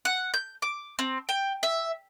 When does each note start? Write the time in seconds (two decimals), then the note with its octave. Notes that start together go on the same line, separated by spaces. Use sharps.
0.05 F#5
0.34 G6
0.62 D6
0.99 C4
1.29 G5
1.63 E5